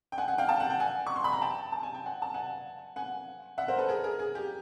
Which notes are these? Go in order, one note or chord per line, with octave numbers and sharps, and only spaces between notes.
G5
F#5 G#5
F#5 G#5
F5 G5
G5 A5
F#5
G5
F#5 G#5
C#6
C6
B5
A#5
G5 A5
A5
G#5
G5
F#5 G#5
A5
F#5 G#5
F#5 G#5
E5 F#5
A#4 C5
A4 B4
G#4 A#4
G#4 A#4
G#4
G4